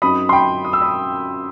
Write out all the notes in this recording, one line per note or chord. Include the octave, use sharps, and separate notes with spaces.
F#2 F#3 C4 D#4 B5 D#6
C6
G5 B5
D#6
E6
B5 D#6